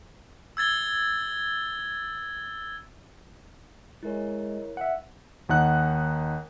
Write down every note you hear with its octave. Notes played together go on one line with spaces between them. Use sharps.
E6 G#6 A6 G7
G#3 E4 A#4 C#5
E5 F#5
D#2 D#4 F#5 F#6